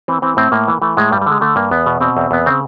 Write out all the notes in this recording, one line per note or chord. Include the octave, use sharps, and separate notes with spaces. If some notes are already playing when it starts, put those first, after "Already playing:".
E3 C4
E3 C4
A2 C4
A2 A#3
E3
E3 A3
A2 G#3
G2 G3
G3
D3 G#3
D3 A3
G2 A#3
E2 B3
B2
B2 C4
E2
E2 B3
C#3 C4